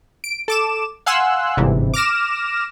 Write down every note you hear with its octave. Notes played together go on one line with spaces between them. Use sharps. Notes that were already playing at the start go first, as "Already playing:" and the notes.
D7
A4 D6 E7
F5 F#5 G#5 C6 E6 F#6
G1 G#2 C3 E3
D6 F6 A#6 E7